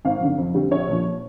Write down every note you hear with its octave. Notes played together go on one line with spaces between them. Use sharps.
G#1 F5
F#2 D3
F2
D3 G3 C4
A#1 C#5
A#2 F3